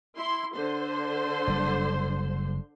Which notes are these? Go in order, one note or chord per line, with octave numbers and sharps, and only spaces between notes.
E4 C6
D3 C5 C6
F#1 G3